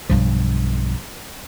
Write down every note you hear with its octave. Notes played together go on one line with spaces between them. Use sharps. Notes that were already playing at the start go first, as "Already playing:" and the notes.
B1 G2 F3